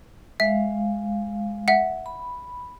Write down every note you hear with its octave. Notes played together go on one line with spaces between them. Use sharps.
G#3 E5 F5
E5 F#5
B5